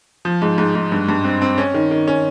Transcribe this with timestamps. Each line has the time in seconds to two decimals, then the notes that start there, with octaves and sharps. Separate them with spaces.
0.25 F3
0.42 G#2
0.58 G#2
0.75 G#2
0.92 G2
1.08 G2
1.24 C4
1.42 C4
1.58 C#4
1.74 D#3
1.91 D#3
2.08 C#4